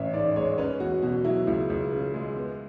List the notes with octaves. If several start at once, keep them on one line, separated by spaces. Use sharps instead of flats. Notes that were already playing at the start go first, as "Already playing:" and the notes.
Already playing: A1 C#4 E5
G#2 D5
G#3 C#5
C#4 B4
E2 F#4
B2 F#4
F#3 E4
C#2 E4
C#2
C#3
G#3
B3